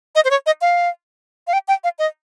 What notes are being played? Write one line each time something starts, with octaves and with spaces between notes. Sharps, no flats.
D#5
C5
C#5
D#5
F5
F5
G5
G5
F5
D#5